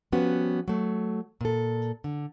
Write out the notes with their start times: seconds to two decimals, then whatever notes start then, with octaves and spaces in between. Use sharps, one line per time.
0.12 F3 G3 B3 C#4 F#4
0.68 F#3 A3
1.41 A#2 A4
2.04 D3